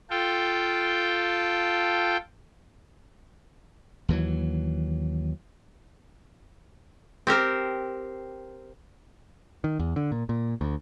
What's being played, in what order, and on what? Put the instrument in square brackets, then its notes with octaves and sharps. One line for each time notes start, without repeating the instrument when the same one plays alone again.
[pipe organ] F4 A4 G5
[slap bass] D#2 E3 F#3
[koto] C4 G4 A#4 C5
[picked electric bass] D#3
E2
D3
A#2
A#2
D2